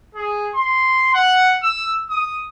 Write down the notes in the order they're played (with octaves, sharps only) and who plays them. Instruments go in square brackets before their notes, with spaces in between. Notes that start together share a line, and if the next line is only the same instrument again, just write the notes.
[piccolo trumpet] G#4
C6
F#5
E6
D#6